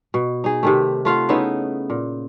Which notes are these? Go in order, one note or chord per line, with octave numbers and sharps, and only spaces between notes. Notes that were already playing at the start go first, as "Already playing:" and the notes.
B2
D#4 G#4
C3 D#3 A3
A3 F4 F5 F#5
C#3 B3 D#4 E4
A#2